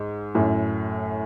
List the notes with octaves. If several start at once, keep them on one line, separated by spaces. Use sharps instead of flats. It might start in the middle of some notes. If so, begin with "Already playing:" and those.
Already playing: G#2
F#2 A2